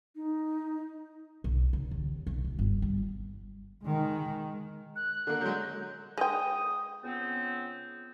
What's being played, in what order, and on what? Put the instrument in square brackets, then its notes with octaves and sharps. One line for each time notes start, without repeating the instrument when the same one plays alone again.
[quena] D#4
[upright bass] B1
C#3
D#2
B1
D2
G1
G3
[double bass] D#3 G#3
[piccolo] F#6
[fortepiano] D3 A#3
[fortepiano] F#3 G#3 [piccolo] G6
[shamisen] G#3 G5 [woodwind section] D#6
[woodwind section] C#2 B3 C4